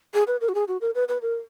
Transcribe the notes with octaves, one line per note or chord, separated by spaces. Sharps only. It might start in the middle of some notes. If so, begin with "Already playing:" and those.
G#4
B4
A#4
F#4
G#4
F#4
A#4
B4
B4
A#4